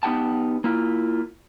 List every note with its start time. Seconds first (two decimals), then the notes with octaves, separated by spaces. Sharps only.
0.03 B3 D#4 G4 F#5 G5 A5
0.64 A#3 E4 F4